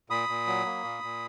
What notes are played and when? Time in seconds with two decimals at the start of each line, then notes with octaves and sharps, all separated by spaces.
0.10 A#2 B5 D#6
0.29 A#2
0.47 F#3
0.65 A#3
0.84 A#2
1.03 A#2